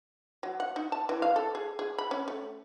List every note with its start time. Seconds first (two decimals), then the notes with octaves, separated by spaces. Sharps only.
0.43 F#3
0.60 F#5
0.76 D#4
0.92 A5
1.09 E3
1.22 F5
1.36 A4
1.55 G#4
1.79 G#4
1.98 B5
2.11 C#4
2.28 A3